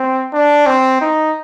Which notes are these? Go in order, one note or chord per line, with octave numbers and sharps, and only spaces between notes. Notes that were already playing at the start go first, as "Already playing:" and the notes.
Already playing: C4
D4
C4
D#4